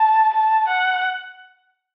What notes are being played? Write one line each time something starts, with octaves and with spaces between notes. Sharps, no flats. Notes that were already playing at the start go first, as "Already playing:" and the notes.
Already playing: A5
A5
F#5